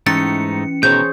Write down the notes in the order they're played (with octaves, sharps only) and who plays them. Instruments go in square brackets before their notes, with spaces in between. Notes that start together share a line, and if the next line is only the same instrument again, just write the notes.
[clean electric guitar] G#2 A3 D#4 [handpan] E3 [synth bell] C#4 C#7 [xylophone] A6
[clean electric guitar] B2 D#3 [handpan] G#4 C5 C#5 [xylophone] G6